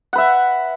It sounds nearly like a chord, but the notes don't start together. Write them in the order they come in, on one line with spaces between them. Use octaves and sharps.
F#5 B4 E5